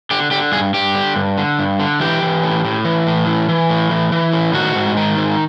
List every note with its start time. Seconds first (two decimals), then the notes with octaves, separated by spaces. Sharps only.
0.11 D3 G4
0.31 D3 G4
0.52 G2 G#4
0.74 G2 G4
0.95 D3
1.16 G2
1.38 D3
1.59 G2
1.80 D3
2.00 E3 G4
2.22 E3
2.44 A2
2.65 A2
2.85 E3
3.07 A2
3.27 E3
3.49 E3
3.70 A2
3.91 E3
4.12 E3
4.33 A2
4.54 D#3 F#4
4.75 G#2
4.97 D#3
5.18 G#2